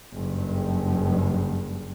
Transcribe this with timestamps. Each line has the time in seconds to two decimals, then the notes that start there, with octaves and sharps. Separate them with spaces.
0.13 F#1 G2